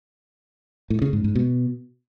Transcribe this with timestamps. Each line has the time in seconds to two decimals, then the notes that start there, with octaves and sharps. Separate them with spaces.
0.90 A2
1.02 C#3
1.13 G#2
1.24 G#2
1.35 B2